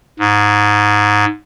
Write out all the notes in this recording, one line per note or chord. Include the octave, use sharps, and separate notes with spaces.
G#2